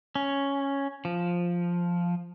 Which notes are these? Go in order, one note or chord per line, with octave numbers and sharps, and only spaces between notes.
C#4
F3